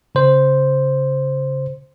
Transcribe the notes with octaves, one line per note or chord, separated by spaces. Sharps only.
C#3 C5